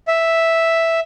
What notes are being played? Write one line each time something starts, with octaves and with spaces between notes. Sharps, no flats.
E5